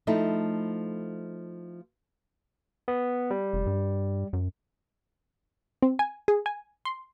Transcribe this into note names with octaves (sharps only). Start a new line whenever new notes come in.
F3 A3 D#4 E4
B3
G3
F1
G2
F#2
C4
G#5
G#4
G#5
C6